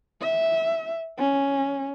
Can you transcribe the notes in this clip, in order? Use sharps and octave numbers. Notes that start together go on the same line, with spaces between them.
E5
C#4